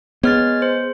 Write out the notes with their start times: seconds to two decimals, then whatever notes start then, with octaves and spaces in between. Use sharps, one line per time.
0.23 G#3 B3 C#5 F6 A6
0.62 C5